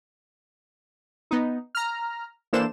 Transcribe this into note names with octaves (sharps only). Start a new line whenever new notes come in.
B3 D#4
A#5 F6
E3 A#3 D4 A4 C5 E7